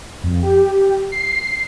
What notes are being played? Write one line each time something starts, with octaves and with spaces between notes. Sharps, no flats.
F2
G4
C7